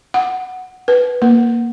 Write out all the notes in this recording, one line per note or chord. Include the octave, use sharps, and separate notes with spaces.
F#5
B4
A#3